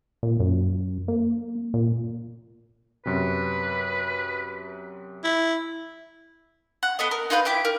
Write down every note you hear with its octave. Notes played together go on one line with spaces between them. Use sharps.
A#2
F#2
A#3
A#2
F#2 C3 B4
E4
F#5
B3 A4 D#5
A#4
D#4 F4 B4 G6
E4 G4 D6 G6
A#4